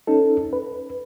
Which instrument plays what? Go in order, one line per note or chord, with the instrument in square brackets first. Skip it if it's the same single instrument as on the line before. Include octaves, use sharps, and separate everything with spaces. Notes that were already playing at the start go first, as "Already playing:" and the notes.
[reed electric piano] C#4 D#4 A4
B4